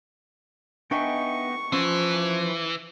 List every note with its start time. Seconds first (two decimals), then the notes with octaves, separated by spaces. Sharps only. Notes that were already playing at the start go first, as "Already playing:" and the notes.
0.91 B3 D4 D#4 E5 G5 G#5 C#6
1.72 E3 F3 C#4 F4 C5